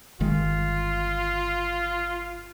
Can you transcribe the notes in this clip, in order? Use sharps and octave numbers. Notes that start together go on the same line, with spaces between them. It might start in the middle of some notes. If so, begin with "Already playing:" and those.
G1 D#3 G#3 F4